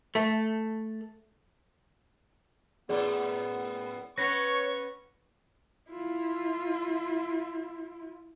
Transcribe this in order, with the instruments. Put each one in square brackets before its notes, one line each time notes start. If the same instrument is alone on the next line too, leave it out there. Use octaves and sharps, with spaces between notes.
[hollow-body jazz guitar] A3
[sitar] F#2 A2 [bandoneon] B3 [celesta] G#4 D5
[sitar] B3 C#4 B4 [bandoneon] C#5 [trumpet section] C#6 [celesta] A#6
[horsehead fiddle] E4 F4